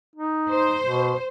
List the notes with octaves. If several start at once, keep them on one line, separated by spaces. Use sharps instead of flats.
D#4
C5
B2